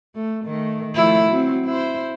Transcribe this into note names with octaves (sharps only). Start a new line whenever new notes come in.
A3
D#3 A3
F3 A3 E4
F#3 C4
E4 C5